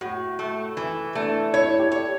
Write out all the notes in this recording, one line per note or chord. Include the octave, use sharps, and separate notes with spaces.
A2 F#4
A3
E3 E4
A3 D4
E4 C#5
G4
C#5